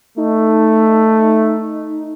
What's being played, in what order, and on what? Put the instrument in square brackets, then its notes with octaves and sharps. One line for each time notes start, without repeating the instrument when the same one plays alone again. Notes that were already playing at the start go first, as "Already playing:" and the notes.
[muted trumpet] A3 [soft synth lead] D#4